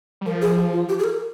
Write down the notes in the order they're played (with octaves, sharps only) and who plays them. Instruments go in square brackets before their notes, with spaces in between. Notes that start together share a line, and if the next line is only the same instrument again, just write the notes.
[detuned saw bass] G3
[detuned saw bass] F3 [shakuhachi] A#4
[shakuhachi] G#4
G#4
F4
G4
G#4
A#4